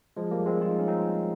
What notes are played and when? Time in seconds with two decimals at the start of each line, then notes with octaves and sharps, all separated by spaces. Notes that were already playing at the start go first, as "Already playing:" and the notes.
0.17 F3 G#3
0.31 G3 A#3
0.46 G#3 C4
0.61 F4
0.71 D#4
0.79 C#4
0.88 C4 D#4